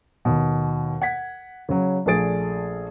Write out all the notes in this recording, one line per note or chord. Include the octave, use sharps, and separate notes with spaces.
D#2 B2
F#5 G#6 B6
C#3 F#3
A#1 A#2 A3 G#4 A6 D7